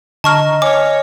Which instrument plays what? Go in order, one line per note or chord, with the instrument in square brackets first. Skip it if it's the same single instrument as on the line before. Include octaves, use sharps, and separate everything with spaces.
[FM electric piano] D3 A#5 [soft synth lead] D#5 [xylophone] A5 C#6 F6
[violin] C#5 [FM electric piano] G#5 F6 [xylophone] D6